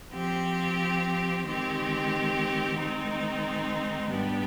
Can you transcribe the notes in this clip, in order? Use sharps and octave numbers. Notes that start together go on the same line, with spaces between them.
F3 C4 G4
D#3 G#3 C4 G4
D#3 G#3 C4 D#4
G#2 G3 B3 D4 G4